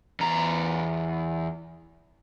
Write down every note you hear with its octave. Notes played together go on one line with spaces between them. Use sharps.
E2 A#5